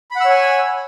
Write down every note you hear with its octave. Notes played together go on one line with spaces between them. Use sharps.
C#5 F#5 G#5 B5 E6